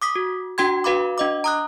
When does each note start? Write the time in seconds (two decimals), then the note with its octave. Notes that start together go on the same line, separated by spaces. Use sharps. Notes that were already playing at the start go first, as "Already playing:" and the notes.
0.02 D6 D#6 B6
0.16 F#4
0.58 D4 F#4 G5 C6 G#6
0.84 F#4 B4 F5 B5 D6
1.18 D4 D#5 D6
1.44 A#5 D#6 F#6